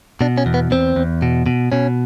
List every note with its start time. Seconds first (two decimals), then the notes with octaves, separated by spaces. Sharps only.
0.21 B2 D4
0.38 C#4
0.46 E2
0.54 B3
0.71 E2 C4
0.96 E2
1.22 B2
1.46 B2
1.72 B2 C#4